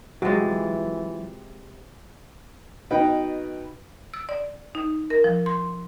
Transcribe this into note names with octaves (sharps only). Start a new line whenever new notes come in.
C3 E3 F#3 G#3 F4 F#4 A6
B2 D#4 B4 G5
E6
D5
D#4
A#4
F3
C6